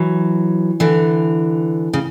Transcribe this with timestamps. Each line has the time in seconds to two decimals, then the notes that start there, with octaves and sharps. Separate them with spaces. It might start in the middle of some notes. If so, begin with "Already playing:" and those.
Already playing: E3 F#3
0.80 D3 E3
1.93 C#3